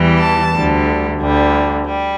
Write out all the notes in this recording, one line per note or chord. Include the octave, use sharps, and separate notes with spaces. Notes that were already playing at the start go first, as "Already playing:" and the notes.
Already playing: E2 E3 G3
A5
D2 D3 G3
D2 D3 G3
G3